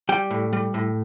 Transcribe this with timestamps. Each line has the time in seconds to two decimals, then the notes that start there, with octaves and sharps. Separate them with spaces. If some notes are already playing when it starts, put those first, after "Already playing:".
0.09 G3 G5
0.31 A2
0.53 G3
0.74 A2